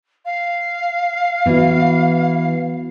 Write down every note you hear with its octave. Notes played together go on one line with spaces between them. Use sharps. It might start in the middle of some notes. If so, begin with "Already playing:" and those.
F5
E3 B3 F#4